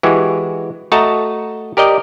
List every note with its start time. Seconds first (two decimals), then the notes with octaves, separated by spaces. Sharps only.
0.03 E3 G#3 F#4 G4
0.92 A3 F#4 D#5 A5 A#5
1.77 G4 A#4 D5 D#5 G5